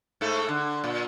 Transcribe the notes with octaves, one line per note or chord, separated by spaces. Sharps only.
G#2 A3 A4
D3
A#2